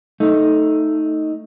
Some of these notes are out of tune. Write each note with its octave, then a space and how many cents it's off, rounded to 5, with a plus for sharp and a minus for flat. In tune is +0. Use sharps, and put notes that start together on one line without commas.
A3 +0 D#4 +5